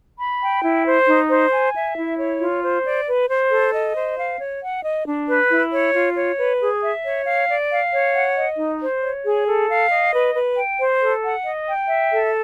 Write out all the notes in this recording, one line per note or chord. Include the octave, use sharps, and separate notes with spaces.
B5
G5
E4
C5
D#4
C5
G#5
E5
E4
C#5
F4
C5
D5
B4
C5
A4
D#5
C5
F5
C#5
F#5
D#5
D4
B4
E4
C#5
F4
C#5
B4
G#4
E5
C#5
F5
D5
F5
C#5
F#5
D#5
D#4
C5
C#5
G#4
A4
F5
D#5
B4
B4
G5
C5
A4
F#5
D#5
G5
E5
A4